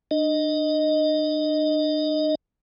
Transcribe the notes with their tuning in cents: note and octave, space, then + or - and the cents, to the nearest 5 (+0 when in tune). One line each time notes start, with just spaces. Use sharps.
D4 +40 D#5 +0